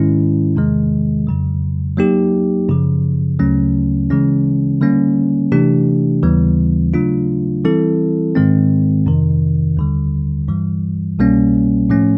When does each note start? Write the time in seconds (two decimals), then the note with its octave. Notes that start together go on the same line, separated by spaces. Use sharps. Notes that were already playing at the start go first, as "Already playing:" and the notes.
Already playing: G#2 D#3 G#3 C#4 E4
0.56 E2 C3 D#3 G#3
1.27 F2 C#3 F#3
1.97 F#3 A#3 D#4 G4
2.69 F#2 C#3 F3
3.39 D2 C#3 F#3 A3 C#4
4.10 C#3 E3 G#3 C#4
4.81 D3 G3 A#3 C#4
5.52 C3 E3 A3 D4 G4
6.23 D#2 C#3 E3 G3 B3
6.94 C#3 F#3 A3 D4 F4
7.64 E3 G3 C4 E4 A4
8.35 G#2 D#3 G#3 C4
9.06 F2 C3 D#3
9.77 D#2 D3 G3
10.48 G2 E3 G3
11.19 C2 B2 G3 A#3 C#4
11.90 A2 F3 A3 C#4